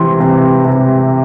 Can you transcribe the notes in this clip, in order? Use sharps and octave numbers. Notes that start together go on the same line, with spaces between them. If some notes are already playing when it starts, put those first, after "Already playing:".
Already playing: C3 E3 C6
C3
C3